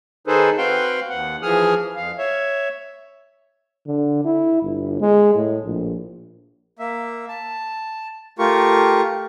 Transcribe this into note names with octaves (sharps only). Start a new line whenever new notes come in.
D#3 D#4 G#4 A4 B4 C5
C4 F#4 B4 F5 G5 C6
D#2 F#5
E3 F3 G#4 D#6 F6
F2 F5
C#5 E5
D3
E4
G1
G#3
A2
A#1
A#3 E5
A5
A3 F4 G4 A#4 C#6